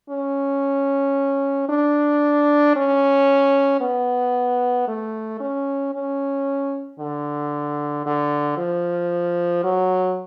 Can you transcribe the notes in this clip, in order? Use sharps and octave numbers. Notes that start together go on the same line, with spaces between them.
C#4
D4
C#4
B3
A3
C#4
C#4
D3
D3
F3
F#3